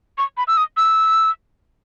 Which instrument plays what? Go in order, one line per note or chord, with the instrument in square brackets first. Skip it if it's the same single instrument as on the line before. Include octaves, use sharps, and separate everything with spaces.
[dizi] C#6
B5
E6
D#6
E6